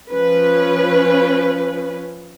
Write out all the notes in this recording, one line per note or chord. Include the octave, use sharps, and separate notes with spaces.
F3 C#4 B4